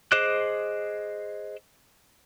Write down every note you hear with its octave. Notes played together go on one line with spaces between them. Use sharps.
G#4 C5 D#5 D6 F#6